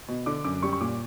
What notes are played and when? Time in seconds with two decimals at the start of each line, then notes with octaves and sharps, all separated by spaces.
0.08 B2
0.26 D3 D6
0.44 F#2 D6
0.62 G3 C#6
0.73 C#6
0.80 A#2 D6